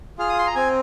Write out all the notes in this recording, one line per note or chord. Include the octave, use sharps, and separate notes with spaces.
F4 G#4 F6
D#6
C6
A#5
C4 G#5